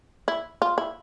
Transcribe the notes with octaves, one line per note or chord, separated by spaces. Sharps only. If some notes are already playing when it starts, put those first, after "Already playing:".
E4
F4
E4